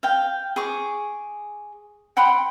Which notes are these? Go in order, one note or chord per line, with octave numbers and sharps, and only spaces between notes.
F5 G5
G#4 C#6 D6
F#5 G5 B5 C6